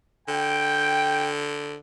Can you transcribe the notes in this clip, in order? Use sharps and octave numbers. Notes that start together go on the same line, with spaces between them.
D3 G5